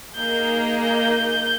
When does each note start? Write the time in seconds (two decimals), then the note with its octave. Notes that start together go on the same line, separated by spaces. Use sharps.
0.15 A#3 D#4 G#4 G6
0.82 G6